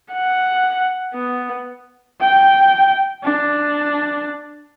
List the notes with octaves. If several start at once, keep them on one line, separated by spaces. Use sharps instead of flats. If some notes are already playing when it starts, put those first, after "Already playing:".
F#5
B3
G5
D4